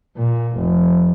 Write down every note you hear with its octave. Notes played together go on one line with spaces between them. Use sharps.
A#2
F1